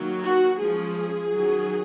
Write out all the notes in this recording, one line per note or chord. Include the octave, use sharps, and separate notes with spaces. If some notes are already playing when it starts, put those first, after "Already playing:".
Already playing: D#3 F#3 A#3
F#4
F3 G#3 C#4 G#4
D#3 F#3 C#4